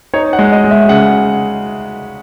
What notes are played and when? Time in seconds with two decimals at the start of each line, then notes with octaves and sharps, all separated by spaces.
0.14 D#4 C#5
0.33 F#5
0.39 G#3
0.52 D#5
0.64 G#3
0.71 E5
0.89 C#3 F#5